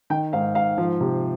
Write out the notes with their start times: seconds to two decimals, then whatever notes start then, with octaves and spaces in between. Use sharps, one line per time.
0.10 D#3 G5
0.33 G#2 F5
0.55 G#2 F5
0.78 F3
1.01 C3